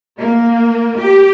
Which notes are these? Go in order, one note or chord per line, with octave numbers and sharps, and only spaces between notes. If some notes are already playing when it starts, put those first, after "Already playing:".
A#3
G4